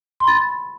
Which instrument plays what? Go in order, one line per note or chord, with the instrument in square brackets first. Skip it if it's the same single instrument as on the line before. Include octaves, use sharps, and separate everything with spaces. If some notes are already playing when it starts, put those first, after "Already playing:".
[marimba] C6
B5
A6